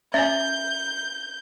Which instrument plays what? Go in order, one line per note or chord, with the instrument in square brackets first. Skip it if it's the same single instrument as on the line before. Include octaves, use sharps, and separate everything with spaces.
[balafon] C#4 C#5 G#5 [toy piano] E5 [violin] G6